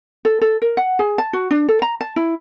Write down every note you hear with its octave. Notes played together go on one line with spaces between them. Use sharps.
A4
A4
A#4
F#5
G#4
A5
F#4
D4
A4
A#5
A5
E4